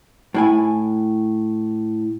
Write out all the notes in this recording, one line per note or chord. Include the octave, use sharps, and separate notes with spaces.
A2 E4 G#5